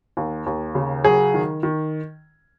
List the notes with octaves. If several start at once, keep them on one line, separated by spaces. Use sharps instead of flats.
D#2
D#2
C#3
F#3 G#4
D#3
D#3